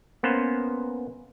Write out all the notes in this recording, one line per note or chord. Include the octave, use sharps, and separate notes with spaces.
A#3 B3 C#4 B4 C5